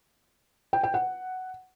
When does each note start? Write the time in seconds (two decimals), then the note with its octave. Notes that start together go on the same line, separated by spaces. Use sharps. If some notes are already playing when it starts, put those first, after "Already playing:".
0.73 G5
0.83 G5
0.94 F#5